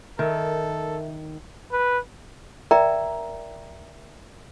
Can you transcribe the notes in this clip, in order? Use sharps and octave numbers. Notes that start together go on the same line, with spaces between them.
D#3 A4 A#4 E5
B4
A#4 D5 E5 G5 A#5